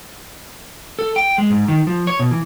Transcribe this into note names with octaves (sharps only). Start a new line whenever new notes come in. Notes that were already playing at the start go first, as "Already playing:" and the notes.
A4
G5
G#3
G#2
D#3
F3
C#5
B2
E3